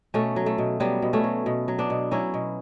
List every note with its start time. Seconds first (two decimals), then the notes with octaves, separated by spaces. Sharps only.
0.14 B2 A3 C#4
0.36 F#3
0.46 A3
0.58 B2
0.80 F#3 G3 B3
1.02 B2
1.13 A3 C#4
1.24 F#3
1.46 B2
1.68 F#3
1.78 B3 D4
1.90 B2
2.11 F#3 C#4 E4
2.34 B2